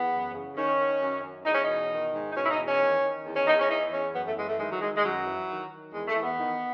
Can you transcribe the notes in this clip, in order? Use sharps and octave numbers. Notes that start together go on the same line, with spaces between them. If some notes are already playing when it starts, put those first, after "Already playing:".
Already playing: E2 B3
F#2
C#3
D#3 C#4
D#3
F#2
F#2
E2 D#4
C#4
D#4
B2
D#3
G#2
D#4
B2 C#4
E4
D#4
E2
C#4
D#3
D#3
E2
C#4
E2 D#4
C#4
E3 D#4
E2 C#4
F#2 B3
A3
E3 G#3
A3
D#3 G#3
F#3
D#3 G#3
G#3
F#2 F#3
E3
D#3
D#3
E2 G#3
A3
E2
B3
D#3